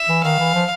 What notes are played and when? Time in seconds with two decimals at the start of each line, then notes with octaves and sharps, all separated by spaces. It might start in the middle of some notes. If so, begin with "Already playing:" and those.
Already playing: E5
0.09 E3
0.23 D#3 F5
0.39 E3
0.54 F3